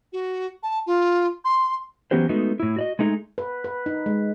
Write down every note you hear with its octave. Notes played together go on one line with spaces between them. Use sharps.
F#4
A5
F4
C6
E3 F#3 B3 C#4 G4 C5
G#3 A3 B3 D#4 F#4
A2 E4
F#4 D5 D#5
G#3 A3 D#4 G4 G#4
B4
B4
D#4
G#3